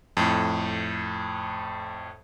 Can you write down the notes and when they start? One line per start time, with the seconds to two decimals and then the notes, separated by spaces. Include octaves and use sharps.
0.17 F2 A2